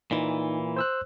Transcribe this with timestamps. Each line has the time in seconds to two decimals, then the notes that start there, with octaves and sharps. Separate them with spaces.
0.11 A#2 E3 D#4
0.76 C5 E6 F#6